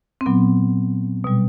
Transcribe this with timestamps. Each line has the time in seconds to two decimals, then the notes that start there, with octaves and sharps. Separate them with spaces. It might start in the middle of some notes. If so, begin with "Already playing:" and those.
0.21 C4
0.26 A#2 F#3 B3
1.24 B2 G3